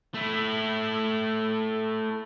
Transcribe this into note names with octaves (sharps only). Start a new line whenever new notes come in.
A3 E4